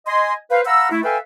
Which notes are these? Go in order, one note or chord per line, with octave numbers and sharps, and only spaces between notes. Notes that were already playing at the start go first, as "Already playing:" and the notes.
D#5 G#5 C6
B4 C5 F5
F5 F#5 A#5 B5 E6
A3 E4
A4 B4 E5 F5 G5 G#5